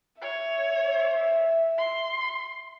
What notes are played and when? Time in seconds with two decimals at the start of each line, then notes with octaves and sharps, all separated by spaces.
0.21 C#5 E5
1.78 C6